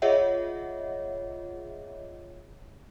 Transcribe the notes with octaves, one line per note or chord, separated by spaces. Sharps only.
F4 G#4 C#5 D#5 E5 F#5